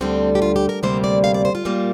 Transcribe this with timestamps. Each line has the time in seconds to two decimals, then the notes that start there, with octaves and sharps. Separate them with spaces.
0.01 D2 D3 G3 C4
0.35 G4
0.42 F4
0.56 G4
0.69 A#4
0.83 D2 C3 G3 A#3 C5
1.04 D5
1.24 F5
1.34 D5
1.45 C5
1.55 F4
1.65 A#2 G3 A#3